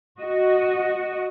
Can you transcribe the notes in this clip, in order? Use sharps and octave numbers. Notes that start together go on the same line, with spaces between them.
F#4 D#5